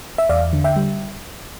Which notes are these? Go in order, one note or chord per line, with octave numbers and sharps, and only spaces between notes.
E5
E2 D5 F5
D3
E5 G5
G3